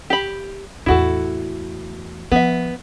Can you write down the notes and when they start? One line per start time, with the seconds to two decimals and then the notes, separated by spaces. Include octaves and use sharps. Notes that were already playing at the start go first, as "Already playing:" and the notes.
0.10 G4 B5
0.86 E2 A2 E4 F#4 A4
2.32 F3 B3 E5